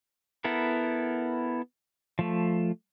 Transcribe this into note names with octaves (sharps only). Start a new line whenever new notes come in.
B3 E4 A4 A#4
F3 A3